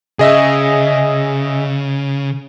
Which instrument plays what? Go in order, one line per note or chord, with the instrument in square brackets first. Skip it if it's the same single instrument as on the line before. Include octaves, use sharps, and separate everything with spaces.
[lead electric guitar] C#3 [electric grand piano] G#4 D#5 E5